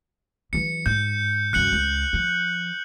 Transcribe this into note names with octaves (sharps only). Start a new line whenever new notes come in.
E3 F#3 C#7
G#2 G6
C2 F#2 F#6 C#7 F#7
C#2
F3